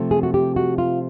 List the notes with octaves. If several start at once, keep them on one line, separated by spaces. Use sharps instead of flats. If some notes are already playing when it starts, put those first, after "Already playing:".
Already playing: C3 F3 A3 C4
G#4
F#4
G4
F#4
F4